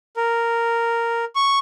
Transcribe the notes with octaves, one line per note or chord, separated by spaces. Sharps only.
A#4
C#6